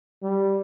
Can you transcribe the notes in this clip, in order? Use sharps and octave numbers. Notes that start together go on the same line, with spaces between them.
G3